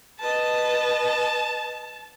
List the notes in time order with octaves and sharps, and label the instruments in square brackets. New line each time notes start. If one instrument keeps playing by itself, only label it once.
[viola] B4 D#5 [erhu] A5